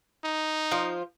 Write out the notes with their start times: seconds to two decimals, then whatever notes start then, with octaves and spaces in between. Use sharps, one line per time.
0.24 D#4
0.71 F3 F4